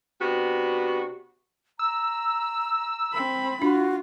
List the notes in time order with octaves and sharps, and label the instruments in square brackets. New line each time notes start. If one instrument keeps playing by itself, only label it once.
[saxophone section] C3 B3 D4 F#4
[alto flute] A#5 [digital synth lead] E6
[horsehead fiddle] C4 B5
[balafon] D4 [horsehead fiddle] F4 [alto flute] F#4